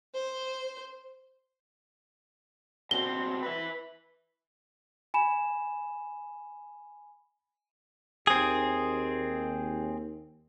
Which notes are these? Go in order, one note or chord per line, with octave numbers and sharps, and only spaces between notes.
C5
B2 C4 G7
B4 E5
G#5 B5 E7
D#2 C4 G#4